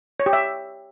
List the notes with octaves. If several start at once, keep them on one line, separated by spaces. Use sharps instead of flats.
C#5
G4
E5